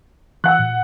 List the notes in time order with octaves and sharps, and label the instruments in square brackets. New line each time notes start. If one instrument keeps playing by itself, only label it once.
[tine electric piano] E3 E6 [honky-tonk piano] F#5 F#6
[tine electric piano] A#2